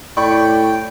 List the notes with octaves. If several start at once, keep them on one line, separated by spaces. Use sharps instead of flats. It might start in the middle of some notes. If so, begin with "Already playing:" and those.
A2 D5 G5 B5 C#6